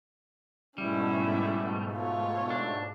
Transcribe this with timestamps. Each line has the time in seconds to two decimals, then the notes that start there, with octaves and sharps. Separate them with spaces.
0.78 G#2 B2 G3 A3 C#4 E4
1.93 F4 C#5
2.50 D4